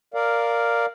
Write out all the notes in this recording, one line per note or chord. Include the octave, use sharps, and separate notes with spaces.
A#4 D5 F5